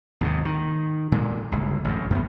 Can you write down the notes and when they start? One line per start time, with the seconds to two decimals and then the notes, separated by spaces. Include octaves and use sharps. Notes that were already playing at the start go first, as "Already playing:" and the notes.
0.21 D#2 G#2 C3
0.45 D#3
1.12 A#2 G#3
1.52 G1 C#2
1.84 A1 F#2
2.10 F#2 A#3 B3